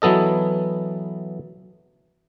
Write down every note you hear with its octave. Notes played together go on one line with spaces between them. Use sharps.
E3 F#3 B3 A4 D#5